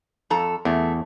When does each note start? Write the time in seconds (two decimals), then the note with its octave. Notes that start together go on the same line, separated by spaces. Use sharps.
0.30 F2 A4 A#5
0.65 E2 A3